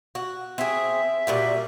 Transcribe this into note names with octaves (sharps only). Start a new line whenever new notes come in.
F#4
C4 G#4 E5
A#2 G3 F#4